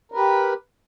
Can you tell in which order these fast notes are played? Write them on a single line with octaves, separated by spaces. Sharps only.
A#4 B4 G4